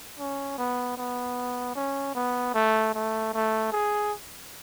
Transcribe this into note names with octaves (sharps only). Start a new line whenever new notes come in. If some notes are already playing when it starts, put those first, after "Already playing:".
C#4
B3
B3
C#4
B3
A3
A3
A3
G#4